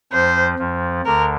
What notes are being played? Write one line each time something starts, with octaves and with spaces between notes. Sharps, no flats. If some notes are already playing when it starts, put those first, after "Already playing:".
F2 F3 C5
F2 F3
D2 D3 A#4